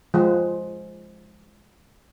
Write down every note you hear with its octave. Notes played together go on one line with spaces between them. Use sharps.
F3 G#3